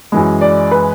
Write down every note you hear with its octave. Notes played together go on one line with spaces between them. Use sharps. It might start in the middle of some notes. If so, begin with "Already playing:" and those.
F#2 E3 G#3
D5
B4